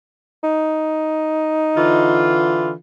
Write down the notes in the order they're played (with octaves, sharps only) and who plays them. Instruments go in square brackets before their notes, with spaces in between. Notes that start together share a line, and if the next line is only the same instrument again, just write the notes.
[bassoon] D#4
[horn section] D3 E3 F4